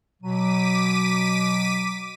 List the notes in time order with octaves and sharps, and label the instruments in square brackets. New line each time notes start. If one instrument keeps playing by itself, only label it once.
[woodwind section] B2 F#3 [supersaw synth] D6 B6 D#7